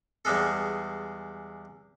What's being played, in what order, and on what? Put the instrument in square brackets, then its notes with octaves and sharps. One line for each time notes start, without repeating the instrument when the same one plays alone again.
[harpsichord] E2 G3 G#3 A4